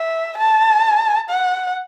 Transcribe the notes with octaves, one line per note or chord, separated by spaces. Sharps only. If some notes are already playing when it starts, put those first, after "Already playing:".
Already playing: E5
A5
F#5